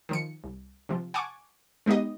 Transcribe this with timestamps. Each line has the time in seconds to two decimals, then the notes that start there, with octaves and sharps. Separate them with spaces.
0.09 D#3 F3 C#7
0.44 C2
0.89 C3 F3
1.14 F#5 G#5 A5 C#6 D6
1.86 G#3 B3 D#4 G4 D#5